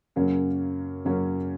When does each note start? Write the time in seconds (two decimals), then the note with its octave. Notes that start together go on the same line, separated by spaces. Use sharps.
0.16 F#2 C#3 F#3 A#3 C#4
1.05 F#2 C#3 F#3 A#3 C#4